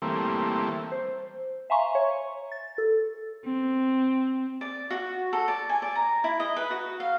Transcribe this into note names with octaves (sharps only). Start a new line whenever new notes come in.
E3 G3 A3 A#3 C4
C5
E5 F5 G#5 A#5 C6 C#6
C#5
A6
A4
C4
D5
F#4
A4
D5
G#5
D5
A#5
E4
D#5
B4
F#4
F5